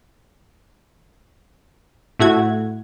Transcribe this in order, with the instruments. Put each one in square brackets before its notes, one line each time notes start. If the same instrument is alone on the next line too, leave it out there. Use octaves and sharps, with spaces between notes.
[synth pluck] A2 E4 F#4 G#6